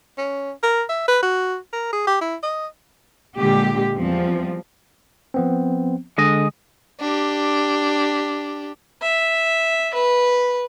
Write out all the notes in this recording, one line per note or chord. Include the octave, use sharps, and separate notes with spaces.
C#4
A#4
E5
B4
F#4
A#4
G#4
G4
E4
D#5
A#2 D3 G#3 G4
E2 F3 G3 C4
F3 B3 C4
D3 G#3 D#5
D4 G4
E5
B4